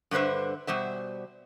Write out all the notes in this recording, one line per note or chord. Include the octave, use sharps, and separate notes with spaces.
G2 D3 B4 C5 E5
B2 G3 C5 E5